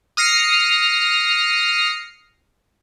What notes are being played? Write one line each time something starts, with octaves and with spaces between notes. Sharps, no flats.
D#6 F6 A#6 C7 C#7